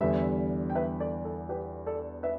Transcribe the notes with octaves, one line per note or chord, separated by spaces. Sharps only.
E2 D3 G3 B4 E5
G5
B4 E5
A4 D5
A4
G4 B4
A4 D5
B4 E5